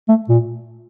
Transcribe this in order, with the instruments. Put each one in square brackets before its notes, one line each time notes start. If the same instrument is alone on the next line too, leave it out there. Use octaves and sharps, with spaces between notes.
[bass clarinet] A3
A#2